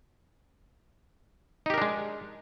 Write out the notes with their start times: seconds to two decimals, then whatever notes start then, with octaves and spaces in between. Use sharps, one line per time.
1.66 D#4
1.70 G4
1.74 A#4
1.78 D4
1.81 G#3